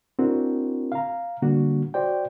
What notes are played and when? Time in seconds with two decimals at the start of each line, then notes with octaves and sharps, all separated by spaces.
0.19 C4 D4 E4 F#4 A#4
0.92 F5 A#5
1.42 D3 G3 A#3 D4 F#4
1.94 F#4 C5 D5 G5